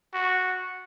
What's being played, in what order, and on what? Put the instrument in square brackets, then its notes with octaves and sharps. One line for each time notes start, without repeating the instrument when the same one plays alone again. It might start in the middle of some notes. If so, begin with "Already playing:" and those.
[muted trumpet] F#4